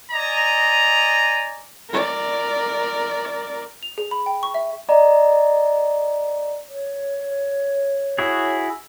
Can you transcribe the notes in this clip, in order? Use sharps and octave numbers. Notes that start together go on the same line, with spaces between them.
D5 D#5 G#5 A#5
A#4 D5
F7
G#4
B5
G5
C#6
E5
D5 D#5 A#5
C#5
E4 F#4 G#4